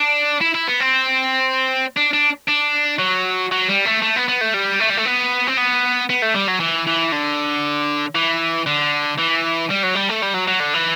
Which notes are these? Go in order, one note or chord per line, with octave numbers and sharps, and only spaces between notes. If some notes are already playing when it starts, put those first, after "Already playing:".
Already playing: D4
E4
E4
B3
C4
D4
D4
D4
F#3
F#3
G3
A3
A3
B3
B3
A3
G3
A3
G3
A3
B3
C4
B3
B3
A3
G3
F#3
E3
E3
D3
E3
D3
E3
G3
F#3
G3
A3
G3
F#3
F#3
D3
E3